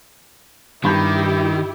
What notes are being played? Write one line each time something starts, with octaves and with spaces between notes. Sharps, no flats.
G2 D#3 E4 G4 B5 G6